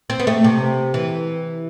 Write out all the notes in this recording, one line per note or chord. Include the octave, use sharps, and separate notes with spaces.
C4
B3
A3
C3
E3